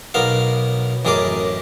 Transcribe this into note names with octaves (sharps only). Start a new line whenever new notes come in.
B1 B3 A#4 F5
A1 F#2 G#4 A#4 D#5 D6